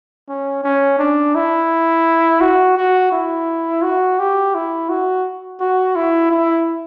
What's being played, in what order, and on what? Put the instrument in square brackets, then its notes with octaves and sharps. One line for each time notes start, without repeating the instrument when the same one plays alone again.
[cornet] C#4
C#4
D4
E4
F#4
F#4
E4
F#4
G4
E4
F#4
F#4
E4
E4